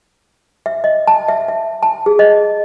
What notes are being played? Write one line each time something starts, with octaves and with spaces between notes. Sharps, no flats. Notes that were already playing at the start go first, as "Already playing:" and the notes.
E5
D#5
A5
E5
E5
A5
G#4
D#5